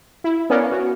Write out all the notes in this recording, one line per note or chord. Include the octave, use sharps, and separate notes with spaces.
E4
B3 C#4 A#4 D5 F5
F#4